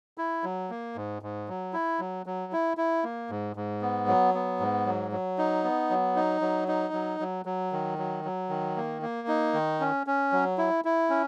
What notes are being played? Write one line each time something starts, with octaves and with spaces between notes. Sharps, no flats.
E4
F#3
A#3
G#2
G#2
F#3
E4
F#3
F#3
E4
E4
A#3
G#2
G#2
B3
F#3
B3
G#2
F#3
F#3
D#4
B3
F#3
D#4
F#3
D#4
F#3
F#3
F#3
D#3
F#3
F#3
D#3
A#3
A#3
D#4
D#3
C#4
C#4
F#3
E4
E4
C#4